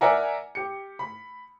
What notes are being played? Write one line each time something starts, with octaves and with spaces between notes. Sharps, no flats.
A#4 D5 E5 F#5 G#5 A#5
G4 C#7
B5